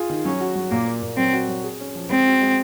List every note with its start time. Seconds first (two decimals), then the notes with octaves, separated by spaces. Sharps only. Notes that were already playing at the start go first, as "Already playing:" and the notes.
Already playing: F4 G#4
0.10 D#3
0.25 F#3 C#4
0.41 F#4
0.56 F#3
0.71 A#2 A#3
0.86 A#3
1.02 A#2
1.17 F#3 C4
1.33 F#4
1.49 F#3
1.64 G#4
1.80 C#4
1.95 F3
2.10 G#3 C4
2.27 F#4
2.42 G#3